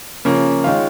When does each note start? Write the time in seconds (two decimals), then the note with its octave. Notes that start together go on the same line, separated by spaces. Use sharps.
0.25 C#3 F3 A#3 C#4
0.64 D#3 G#3 F4 C#5 F5